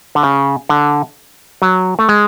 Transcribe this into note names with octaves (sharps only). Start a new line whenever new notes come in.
D3
C#3
D3
F#3
A3
G#3